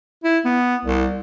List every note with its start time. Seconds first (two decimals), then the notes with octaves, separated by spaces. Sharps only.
0.24 E4
0.45 B3
0.85 C2